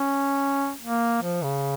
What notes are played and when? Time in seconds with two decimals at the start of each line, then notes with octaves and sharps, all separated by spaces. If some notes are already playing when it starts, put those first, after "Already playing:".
Already playing: C#4
0.82 A#3
1.23 F3
1.43 C#3